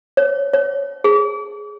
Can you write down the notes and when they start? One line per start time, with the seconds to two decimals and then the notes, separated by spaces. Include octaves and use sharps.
0.17 C#5
0.53 C#5
1.04 G#4